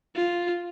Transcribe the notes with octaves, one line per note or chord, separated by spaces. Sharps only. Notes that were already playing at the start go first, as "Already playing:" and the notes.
F4